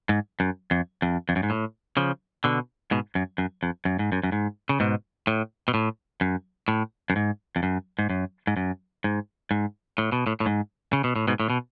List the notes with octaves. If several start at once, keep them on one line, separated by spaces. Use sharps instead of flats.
G#2
F#2
F2
F2
F2
F#2
G#2
A2
C#3 F3
B2 D3
G#2 B2
F#2
F#2
F2
F#2
G#2
F#2
F#2
G#2
C#3
G#2 B2
A2
B2
A2
F#2
A2
F#2
G#2
F2
F#2
G#2
F#2
G#2
F#2
G#2
G#2
A2
B2
A2
A2
G#2
C#3
B2
A2
G#2 B2
A2
B2